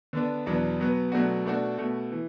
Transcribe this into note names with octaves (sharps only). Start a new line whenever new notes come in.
D3 B3 D4
E2 B2 F#3 B3 D4
B2 F#3 B3
B2 F#3 A3 D4 F#4
B2 A3 D4 F#4
B2 A3 F#4
E3